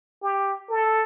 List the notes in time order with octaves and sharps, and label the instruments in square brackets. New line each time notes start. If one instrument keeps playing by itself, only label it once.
[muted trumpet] G4
A4